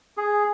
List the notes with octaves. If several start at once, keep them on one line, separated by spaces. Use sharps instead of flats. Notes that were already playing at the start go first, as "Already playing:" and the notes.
G#4